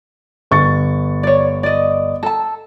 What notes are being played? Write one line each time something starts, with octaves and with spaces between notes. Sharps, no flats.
G1 C#6 A6
C#5 D5
D5 D#5
A4 A5